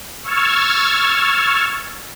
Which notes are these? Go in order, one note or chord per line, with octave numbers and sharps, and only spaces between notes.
C#6 E6 F6 G#6 A6